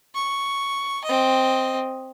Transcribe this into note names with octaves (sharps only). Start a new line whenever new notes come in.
C#6
C4 D#5